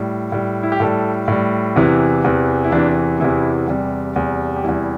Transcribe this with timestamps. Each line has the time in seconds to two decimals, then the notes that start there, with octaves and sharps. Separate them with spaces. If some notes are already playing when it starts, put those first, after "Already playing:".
Already playing: A2 G3
0.32 A2 G3
0.63 E4
0.72 G4
0.80 A2 G3 A4
1.28 A2 G3
1.76 E2 C3 E3 E4
2.24 E2 C3 E3
2.64 E4
2.72 E2 C3 E3 D4
3.20 E2 C3 E3 E4
3.68 E2 C3 G3
4.16 E2 C3 G3
4.56 G4
4.64 E2 C3 G3 E4